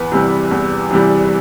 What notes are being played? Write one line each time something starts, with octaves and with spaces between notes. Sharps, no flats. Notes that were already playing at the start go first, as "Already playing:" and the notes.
Already playing: E2 B4
C3 E3 G3
E2
C3 E3 G3